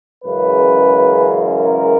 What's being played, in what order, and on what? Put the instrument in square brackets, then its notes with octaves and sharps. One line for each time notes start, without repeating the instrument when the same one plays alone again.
[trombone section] F#2 C#3 E3 G#3 B4
A#4